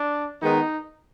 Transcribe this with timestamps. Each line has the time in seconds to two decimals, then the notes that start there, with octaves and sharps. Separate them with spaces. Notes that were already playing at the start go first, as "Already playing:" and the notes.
Already playing: D4
0.41 D#3 G#3 B3 D#4